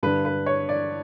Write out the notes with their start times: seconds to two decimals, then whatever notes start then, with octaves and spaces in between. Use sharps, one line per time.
0.03 G2 D3 B4
0.25 B4
0.46 C#5
0.69 D5